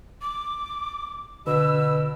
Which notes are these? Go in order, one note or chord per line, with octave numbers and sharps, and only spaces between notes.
D6
B2 D3 B4 E6